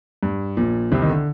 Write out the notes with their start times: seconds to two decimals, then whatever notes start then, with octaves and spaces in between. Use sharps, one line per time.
0.23 G2
0.57 A#1 A#2
0.92 C2 C3
1.02 D#3
1.09 D3